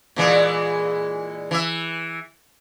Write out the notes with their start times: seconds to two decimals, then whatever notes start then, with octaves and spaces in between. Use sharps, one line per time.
0.16 A#2 E3 G#3
1.51 E3 E5